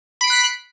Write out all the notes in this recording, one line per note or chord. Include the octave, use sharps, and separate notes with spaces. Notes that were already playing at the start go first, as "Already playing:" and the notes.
B5 F#6 B6 C7 D7